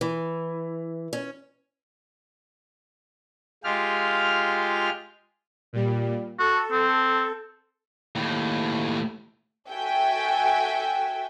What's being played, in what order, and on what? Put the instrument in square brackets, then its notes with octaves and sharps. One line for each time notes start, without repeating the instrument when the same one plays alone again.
[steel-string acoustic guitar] E3
C#4
[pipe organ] G#3 F4 G4 F6
[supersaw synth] A#2 G3
[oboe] F#4 [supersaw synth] A4
[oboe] C4
[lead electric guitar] D#2 A2
[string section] F#4 A4 E5 G5 G#5